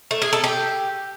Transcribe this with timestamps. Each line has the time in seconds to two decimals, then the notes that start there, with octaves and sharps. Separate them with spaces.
0.11 A3
0.22 G#4
0.33 A4
0.44 G4